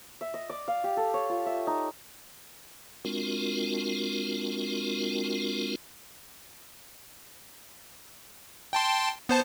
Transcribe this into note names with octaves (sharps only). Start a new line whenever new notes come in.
E5
D#5
D5
F5
G4
A4
C#5
F4
E5
D#4
G#3 C4 D4 F4 F#4 A#4
G5 A5 C6
B3 C5 A5